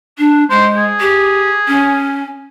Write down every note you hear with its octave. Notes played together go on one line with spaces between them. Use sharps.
D4
G#3 C5
G#4
G4
C#4